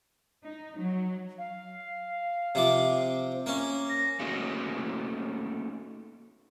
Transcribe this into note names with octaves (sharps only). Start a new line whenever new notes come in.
D#4
F#3
F5
C3 F3 D6
A#3 C#4
A#6
A3 A#3 C#4 D#4 F#4 G#4